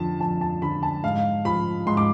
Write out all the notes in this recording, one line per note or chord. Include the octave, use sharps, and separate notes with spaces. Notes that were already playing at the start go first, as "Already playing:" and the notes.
Already playing: F2 D3 F3 A5
F2 A5
A5
D3 F3 B5
A5
G#2 F5
F3 B5
G#2 C6
D6